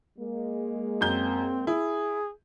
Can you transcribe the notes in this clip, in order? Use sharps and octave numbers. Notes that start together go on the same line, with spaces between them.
G#3 A#3
F#2 C4 G6
E4 G#4